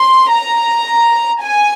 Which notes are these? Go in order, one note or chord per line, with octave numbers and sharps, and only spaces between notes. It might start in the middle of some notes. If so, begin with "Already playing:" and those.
Already playing: C6
A#5
G#5